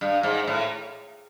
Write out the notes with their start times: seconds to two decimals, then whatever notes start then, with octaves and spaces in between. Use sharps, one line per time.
0.01 G2
0.23 G#2
0.48 A2